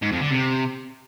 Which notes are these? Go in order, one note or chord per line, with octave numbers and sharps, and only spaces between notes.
G#2
F2
D3
C3